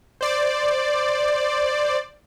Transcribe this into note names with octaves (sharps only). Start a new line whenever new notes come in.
C5 D5